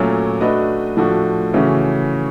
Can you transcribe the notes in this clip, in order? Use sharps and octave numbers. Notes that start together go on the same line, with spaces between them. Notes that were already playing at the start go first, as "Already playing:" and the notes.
Already playing: A#2 F#3 A3 C#4
A3 D4 F#4 B4 D#5
A2 F3 A3 D4 F#4
C#3 E3 A3 C#4 F#4